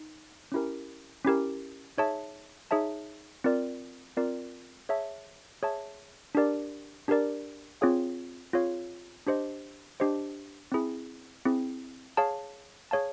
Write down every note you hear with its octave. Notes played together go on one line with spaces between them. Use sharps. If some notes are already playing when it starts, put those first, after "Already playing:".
Already playing: D#4
C#4 E4 G4 A#4
C#4 E4 G4 A#4
D#4 G#4 C#5 E5 A5
D#4 G#4 C#5 E5 A5
C4 F4 A#4 D5
C4 F4 A#4 D5
G#4 C#5 E5 A5
G#4 C#5 E5 A5
D4 G4 A#4 D5
D4 G4 A#4 D5
C4 F4 G#4 C#5 F5
C4 F4 G#4 C#5 F5
D4 G4 C5 D#5
D4 G4 C5 D#5
C4 E4 G#4
C4 E4 G#4
G#4 C#5 F5 A5
G#4 C#5 F5 A5